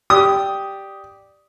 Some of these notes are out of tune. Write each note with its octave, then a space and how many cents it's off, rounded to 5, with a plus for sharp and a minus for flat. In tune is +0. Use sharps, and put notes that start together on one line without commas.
G4 +0 D5 +5 D#6 +10